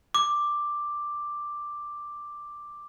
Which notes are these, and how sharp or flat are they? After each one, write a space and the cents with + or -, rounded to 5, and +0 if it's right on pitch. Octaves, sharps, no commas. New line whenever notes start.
D6 +5